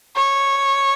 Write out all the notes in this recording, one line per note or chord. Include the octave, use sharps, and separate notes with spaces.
C#5